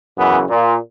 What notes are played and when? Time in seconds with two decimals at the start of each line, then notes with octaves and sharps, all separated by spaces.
0.16 F#2 C#3 E3 B3
0.49 A#2